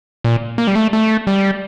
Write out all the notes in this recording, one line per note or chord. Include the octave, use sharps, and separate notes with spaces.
A#2
A#3
G3
A3
A3
G3